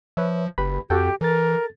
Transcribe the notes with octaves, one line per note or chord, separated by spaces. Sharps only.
F3 B4 C#5 E5
F#1 G4 B4 B5
F2 F#4 G4 A4 G5
E3 A4 A#4 A6